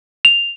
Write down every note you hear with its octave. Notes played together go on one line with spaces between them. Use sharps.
F7